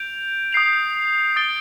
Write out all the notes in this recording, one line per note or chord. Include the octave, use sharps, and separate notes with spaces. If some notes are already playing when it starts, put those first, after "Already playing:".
Already playing: G6 D7 F7
D#6 G6 C7 F7
D#6 A6 D7 G7